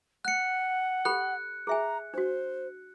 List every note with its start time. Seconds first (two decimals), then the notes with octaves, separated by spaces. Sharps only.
0.25 F#5 F#6 C#7
1.05 G4 A4 B5 F#6
1.67 G#4 E5 G#5 A#5
2.14 D4 F#4 C5